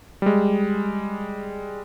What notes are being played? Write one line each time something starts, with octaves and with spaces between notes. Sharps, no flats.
G3 G#3